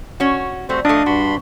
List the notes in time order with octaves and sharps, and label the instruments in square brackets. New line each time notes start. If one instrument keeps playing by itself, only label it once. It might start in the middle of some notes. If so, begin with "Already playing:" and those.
[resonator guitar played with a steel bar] C#4 F#4
[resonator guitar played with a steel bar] G3 A3 [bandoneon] C4 F#4 C5
[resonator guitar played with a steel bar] F3 A3 [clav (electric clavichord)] D4 [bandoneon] D#5 F5 D#6
[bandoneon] G2 B5 C6 [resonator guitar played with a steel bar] F#4